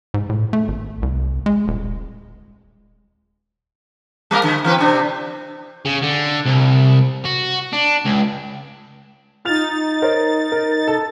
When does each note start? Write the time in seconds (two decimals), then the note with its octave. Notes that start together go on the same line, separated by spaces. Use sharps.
0.14 G#2
0.30 A2
0.53 A3
0.68 G#1
1.02 C2
1.46 G#3
1.68 D#1
4.31 G3 A#3 A#4
4.43 D3
4.64 E3 C4 B4
4.78 C3 D4
5.85 C#3
6.03 D3
6.46 C2
7.25 F#4
7.73 D4
8.05 C#2
9.45 D#4 F4 F6 A6 F7
10.02 A#4 C5 C#5
10.52 A#4
10.87 A4